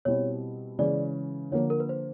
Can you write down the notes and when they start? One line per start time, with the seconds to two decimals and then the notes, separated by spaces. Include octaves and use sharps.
0.05 B2 G3 C4 E4 C#5
0.79 C#3 E3 G#3 C#4 D5
1.51 D3 F3 A#3 C#5
1.70 A#4
1.80 B4
1.89 C5